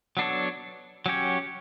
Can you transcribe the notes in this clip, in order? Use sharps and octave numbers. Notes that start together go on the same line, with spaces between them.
F#3 B3 D4 A4 C#5
F#3 C#4 G4 C#5